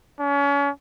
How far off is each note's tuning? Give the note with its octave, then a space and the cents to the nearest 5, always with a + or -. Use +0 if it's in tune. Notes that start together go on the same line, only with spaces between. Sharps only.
C#4 +35